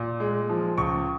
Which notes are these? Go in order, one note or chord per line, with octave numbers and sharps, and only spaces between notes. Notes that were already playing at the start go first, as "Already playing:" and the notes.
Already playing: A#2
G#3
F3
C#2 C#6